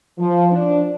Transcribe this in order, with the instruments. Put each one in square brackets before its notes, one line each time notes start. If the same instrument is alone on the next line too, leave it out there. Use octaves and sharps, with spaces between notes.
[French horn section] F3
D4